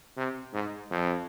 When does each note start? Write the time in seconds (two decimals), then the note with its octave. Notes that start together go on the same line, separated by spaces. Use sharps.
0.17 C3
0.53 G#2
0.91 F2